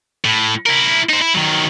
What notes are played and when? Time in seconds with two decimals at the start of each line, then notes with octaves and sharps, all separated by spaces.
0.25 A2
0.66 E4 A#4
1.09 D#4 C5
1.21 E4
1.34 D#3 F#3